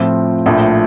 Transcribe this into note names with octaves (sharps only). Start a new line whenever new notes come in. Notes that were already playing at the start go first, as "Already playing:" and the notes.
Already playing: A2 F3 C4 F4
A#1 A2 F3